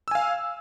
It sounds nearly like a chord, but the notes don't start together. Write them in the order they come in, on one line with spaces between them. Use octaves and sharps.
E6 G#5 F5